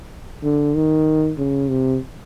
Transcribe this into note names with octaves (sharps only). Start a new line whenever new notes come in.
D3
D#3
C#3
C3